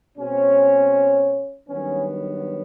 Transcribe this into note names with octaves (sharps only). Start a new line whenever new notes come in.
B2 G#3 C4 C#4
G2 D#3 F#3 B3 C#4